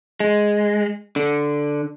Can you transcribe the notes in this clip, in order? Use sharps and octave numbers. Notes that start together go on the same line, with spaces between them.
G#3
D3